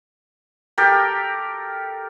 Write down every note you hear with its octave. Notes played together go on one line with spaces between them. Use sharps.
G4 A4 A#4